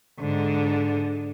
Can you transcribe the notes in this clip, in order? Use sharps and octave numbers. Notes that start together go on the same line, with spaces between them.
G#2 D3